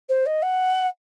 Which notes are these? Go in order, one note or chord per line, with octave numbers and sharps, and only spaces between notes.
C5
D#5
F#5